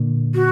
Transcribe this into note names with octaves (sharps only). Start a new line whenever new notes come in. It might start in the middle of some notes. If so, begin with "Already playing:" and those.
Already playing: A#2 D3
F#4